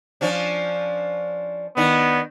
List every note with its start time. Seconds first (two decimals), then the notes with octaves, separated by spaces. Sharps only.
0.21 F3 C#4 D4
1.77 D#3 B3 D4